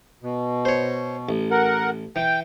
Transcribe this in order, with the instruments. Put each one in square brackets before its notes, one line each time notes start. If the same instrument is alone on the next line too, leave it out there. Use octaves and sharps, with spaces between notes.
[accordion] B2
[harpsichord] C5 C#5
A1
[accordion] A#4 F#5
[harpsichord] E3 [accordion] G5